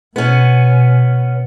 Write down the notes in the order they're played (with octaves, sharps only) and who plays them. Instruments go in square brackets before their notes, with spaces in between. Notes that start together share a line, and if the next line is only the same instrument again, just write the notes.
[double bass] B2 [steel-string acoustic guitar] B3 C#4